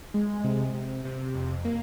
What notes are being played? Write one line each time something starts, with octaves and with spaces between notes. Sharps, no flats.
G#3
C3
C3
C3
F2
A#3